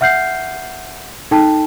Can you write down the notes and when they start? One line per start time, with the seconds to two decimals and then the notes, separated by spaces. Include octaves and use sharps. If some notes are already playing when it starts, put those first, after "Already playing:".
0.01 E5 F#5 F6 G6 C7
1.31 D#4 A4 G5 A5